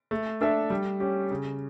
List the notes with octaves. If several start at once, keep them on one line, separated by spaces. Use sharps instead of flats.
A3
D4 A4 E5
G3
C#4 G4
C#3